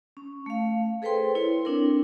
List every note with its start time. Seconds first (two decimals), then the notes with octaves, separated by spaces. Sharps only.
0.17 C#4
0.46 A3 F5
1.02 G#4 A4 B4 C5 G5 C6
1.35 E4 C#5
1.65 C4 D4 E4 A#4